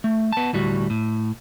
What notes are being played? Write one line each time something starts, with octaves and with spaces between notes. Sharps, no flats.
A3
B3 A5
D2 A2 G3 F#4
A2